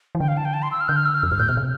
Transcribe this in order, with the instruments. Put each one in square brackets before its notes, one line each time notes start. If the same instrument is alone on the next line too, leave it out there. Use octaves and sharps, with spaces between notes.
[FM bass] E3
[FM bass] D3 [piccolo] G5
[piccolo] F5
A5
G5
A5
C6
E6
F6
[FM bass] D3 [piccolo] G6
[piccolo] F6
E6
F6
[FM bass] F2 [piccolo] E6
[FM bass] G2 [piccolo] F6
[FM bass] A2 [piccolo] G6
[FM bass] B2 [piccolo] F6
[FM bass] C3